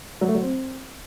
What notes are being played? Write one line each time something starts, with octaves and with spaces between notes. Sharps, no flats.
F#3
A3
F#3
C4